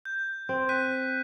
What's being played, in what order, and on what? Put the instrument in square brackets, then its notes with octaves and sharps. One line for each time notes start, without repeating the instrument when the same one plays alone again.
[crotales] G6
[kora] C4
[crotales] F#6 B6 D#7